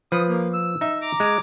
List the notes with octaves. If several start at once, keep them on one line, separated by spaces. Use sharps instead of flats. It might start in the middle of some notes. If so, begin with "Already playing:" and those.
F3 B4 D#6
A#3
E6
D#4 E5
A#5 D6
G#3